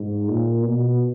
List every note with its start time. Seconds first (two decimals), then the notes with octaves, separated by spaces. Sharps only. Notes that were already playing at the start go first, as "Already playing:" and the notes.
Already playing: G#2
0.29 A#2
0.63 B2